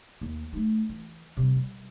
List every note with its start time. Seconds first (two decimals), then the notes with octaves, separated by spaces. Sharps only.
0.21 D#2
0.53 A3 D#4
0.89 E3
1.37 C3 G3
1.55 G3